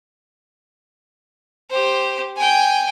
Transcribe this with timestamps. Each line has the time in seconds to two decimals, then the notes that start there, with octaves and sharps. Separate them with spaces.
1.70 G4 C5
2.37 G5 G#5